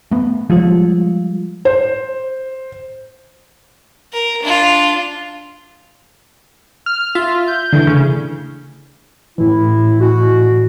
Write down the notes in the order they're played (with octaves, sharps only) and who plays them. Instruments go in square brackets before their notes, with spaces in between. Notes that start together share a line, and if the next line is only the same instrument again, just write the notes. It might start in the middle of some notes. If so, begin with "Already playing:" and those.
[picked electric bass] A3 B3
[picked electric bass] F3 [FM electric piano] G3 G#3 F4
[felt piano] C5
[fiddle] A#4
D4 F4
[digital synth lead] F6
[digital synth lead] F4 [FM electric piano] E5
[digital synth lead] G6
[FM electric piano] D3 E3 A3
[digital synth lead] C#3
[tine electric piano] A2 E3 [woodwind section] E4
[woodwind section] F#4